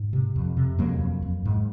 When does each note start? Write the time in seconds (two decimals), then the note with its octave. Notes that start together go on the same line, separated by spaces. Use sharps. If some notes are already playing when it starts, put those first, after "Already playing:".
Already playing: G#2
0.13 C3
0.36 F2
0.57 C3
0.78 F2 F#3 A#3
1.01 F2
1.22 F2
1.46 G#2